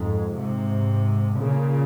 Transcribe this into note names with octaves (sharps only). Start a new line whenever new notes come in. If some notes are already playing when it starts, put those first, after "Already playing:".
Already playing: F2 G#2
G#2 C3
A#2 C#3